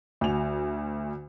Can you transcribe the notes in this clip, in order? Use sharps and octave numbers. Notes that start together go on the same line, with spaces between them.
D2 F#4 G#5 F7